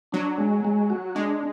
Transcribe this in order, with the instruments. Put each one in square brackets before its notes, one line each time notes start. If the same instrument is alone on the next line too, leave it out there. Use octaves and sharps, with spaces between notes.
[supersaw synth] F#3 [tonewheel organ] D4
[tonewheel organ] G#3
G#3
F#4
[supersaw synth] G#3 [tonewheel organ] D4